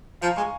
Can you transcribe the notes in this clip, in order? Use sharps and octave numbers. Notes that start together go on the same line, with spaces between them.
F3 F5 A#5
G#3 G#5 C#6